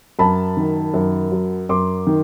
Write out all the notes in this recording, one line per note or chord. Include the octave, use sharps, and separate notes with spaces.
F#2 A5 B5
D#3
F#2
F#3
F#2 C6 D6
D#3